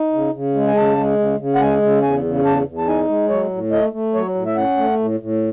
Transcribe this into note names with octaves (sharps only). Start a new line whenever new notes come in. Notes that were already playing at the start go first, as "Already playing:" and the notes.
Already playing: D#4
C#3
C#3
G#3
G#5
C#3 A5
G#3
C#3
C#3
F#5
G#3 G#5
C#3
E2 G#5
C#3
E2 A5
E2
A5
D#4 G#5
G#3
F#3 C#5
A2
A3 D#5
A3
F#3 C#5
A2
E5
C#4 F#5
A3
A2
A2